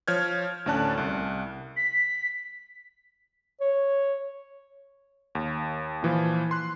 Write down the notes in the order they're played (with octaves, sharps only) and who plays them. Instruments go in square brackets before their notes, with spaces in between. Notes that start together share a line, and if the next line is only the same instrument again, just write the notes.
[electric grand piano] F3 C#5 F6 G6 G#6
D2 A2 C#4 D5 A5 F#6
C2
[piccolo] B6
[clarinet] C#5
[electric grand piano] D#2
A#2 E3 F3
C6 F#6